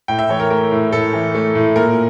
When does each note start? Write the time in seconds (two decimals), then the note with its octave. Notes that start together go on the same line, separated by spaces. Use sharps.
0.08 A2 G5
0.19 E5
0.29 E3 C#5
0.40 A#4
0.50 A3 A#4
0.72 A2
0.92 A2 A4
1.14 E3
1.35 A3
1.55 A2
1.76 A#2 A#4